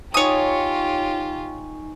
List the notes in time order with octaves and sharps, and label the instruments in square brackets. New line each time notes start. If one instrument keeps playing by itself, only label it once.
[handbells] D#4 G#5 C#6 [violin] F4 G4 [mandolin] C#5 D#6